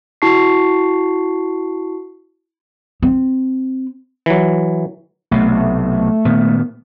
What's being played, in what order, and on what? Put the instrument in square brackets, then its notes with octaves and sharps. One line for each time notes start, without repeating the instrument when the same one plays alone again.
[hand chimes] E4 F#4 A5 C#6 C7
[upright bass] C4
[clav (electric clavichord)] E3 F#3
[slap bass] B1 C3 [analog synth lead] A3
[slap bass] A#2 D#3 B3